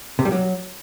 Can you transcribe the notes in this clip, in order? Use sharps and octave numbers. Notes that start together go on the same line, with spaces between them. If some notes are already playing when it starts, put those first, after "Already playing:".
C3
G3
F#3